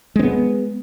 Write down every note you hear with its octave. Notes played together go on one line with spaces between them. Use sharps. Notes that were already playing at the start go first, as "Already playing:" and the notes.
G#3 B3 C4